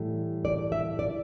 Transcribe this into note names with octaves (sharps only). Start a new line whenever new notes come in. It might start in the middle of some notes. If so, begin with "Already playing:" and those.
Already playing: A2 E3 G3
D5
E5
D5